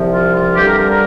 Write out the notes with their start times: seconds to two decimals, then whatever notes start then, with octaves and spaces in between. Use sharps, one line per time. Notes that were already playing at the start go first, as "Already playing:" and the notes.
Already playing: C2 C3 F3
0.12 F4
0.34 F4
0.56 G2 D3 G3 G4
0.66 A#4
0.78 A#4
0.89 A#4